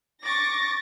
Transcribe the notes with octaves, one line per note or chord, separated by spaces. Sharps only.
C#6 D6 A6 A#6